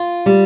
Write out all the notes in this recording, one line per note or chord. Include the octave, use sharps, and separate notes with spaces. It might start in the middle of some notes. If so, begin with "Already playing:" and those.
Already playing: F4
G3